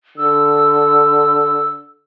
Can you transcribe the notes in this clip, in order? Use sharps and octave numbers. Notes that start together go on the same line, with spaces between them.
D3 E6